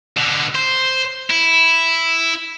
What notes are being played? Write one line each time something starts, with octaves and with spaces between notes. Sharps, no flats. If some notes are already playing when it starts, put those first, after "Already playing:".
B2 D3
C5
E4